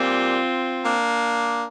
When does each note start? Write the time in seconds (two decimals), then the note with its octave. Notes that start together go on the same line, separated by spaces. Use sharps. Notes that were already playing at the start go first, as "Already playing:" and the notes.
Already playing: A#2 G3 A#3 C4 F4
0.84 A#3 D4